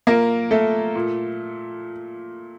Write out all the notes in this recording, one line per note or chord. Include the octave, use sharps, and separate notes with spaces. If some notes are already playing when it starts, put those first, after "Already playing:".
A#2 A#3 A#4
A3 A4
A#2